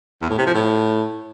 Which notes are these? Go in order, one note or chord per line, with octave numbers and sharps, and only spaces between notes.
E2
A2
C3
F3
A2